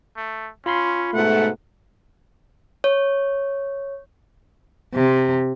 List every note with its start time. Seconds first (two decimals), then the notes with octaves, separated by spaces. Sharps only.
0.17 A3
0.66 C#4 F4 B5 C6
1.14 G#2 B2 A3 F#5
2.84 C#5
4.94 C3